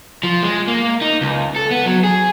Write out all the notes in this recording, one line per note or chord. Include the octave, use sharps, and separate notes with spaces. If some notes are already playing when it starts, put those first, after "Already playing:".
F3
G#3
A#3
D#4
C#2
A4
B3
F#3
G#4